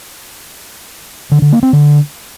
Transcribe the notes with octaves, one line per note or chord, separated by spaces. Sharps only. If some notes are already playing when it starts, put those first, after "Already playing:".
D3
D3
A#3
C4
D3